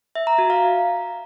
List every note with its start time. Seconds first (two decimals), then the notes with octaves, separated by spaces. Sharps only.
0.15 E5
0.27 A#5
0.38 F#4
0.50 F5